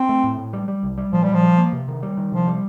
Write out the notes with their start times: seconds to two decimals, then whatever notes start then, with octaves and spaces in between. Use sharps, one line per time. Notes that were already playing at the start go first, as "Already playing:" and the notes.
Already playing: C4
0.09 A3
0.24 A2
0.39 A2
0.53 G3
0.68 G3
0.83 C2
0.98 G3
1.12 A#2 F3
1.23 A#2 G3
1.34 F3
1.43 G3
1.58 A#3
1.73 C3
1.88 D#3
2.03 G3
2.17 D#3
2.32 C3 F3
2.47 G3